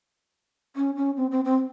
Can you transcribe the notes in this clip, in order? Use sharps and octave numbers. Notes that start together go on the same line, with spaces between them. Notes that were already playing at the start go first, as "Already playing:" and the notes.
C#4
C#4
C4
C4
C4